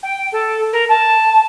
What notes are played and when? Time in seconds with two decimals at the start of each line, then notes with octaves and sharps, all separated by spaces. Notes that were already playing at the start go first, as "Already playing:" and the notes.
0.03 G5
0.32 A4
0.73 A#4
0.89 A5